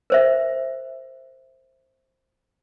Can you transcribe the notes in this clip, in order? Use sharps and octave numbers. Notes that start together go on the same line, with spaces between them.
A#4 C5 E5